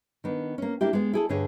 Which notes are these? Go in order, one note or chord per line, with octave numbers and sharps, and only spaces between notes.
D#3 B3 D4
A#3 C#4
A#3 D4 E4 G4
G#3 B3
E4 G#4 A4
D2 G2 D3 G3 G#4 C#5